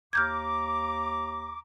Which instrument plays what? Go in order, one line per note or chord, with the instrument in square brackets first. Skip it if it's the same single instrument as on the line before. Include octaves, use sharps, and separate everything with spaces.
[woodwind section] D#2 A#5 D6 [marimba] F6 G6 G#6